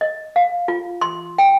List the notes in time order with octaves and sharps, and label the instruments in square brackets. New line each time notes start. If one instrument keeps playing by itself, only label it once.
[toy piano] D#5
F5
F4
C6
G5